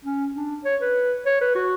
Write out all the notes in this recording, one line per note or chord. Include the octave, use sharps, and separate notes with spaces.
C#4
D4
C#5
B4
C#5
B4
F#4